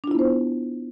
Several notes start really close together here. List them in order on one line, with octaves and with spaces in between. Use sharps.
D4 F4 E4 B3 C5